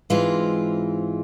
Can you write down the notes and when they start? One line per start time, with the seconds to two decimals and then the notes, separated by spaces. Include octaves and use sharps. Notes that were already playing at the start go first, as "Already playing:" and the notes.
0.10 G#2 E3 G#3 C4 F4